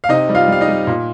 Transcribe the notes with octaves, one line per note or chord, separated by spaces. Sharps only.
F5
C3 D#4 D#5
G3
F4 F5
G3 F5
D#4 D#5
G3
A#2